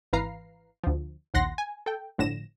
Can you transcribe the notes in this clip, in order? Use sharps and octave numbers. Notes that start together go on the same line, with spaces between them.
G#1 E3 B4 F5 A#5 C7
D2 F3
A#1 D#2 F#5 C6 A#6
G#5
A4 G5
G1 A2 D3 F3 A#6 E7